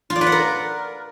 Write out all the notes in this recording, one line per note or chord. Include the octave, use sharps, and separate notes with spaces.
F4
D5
B4
F#5
A#4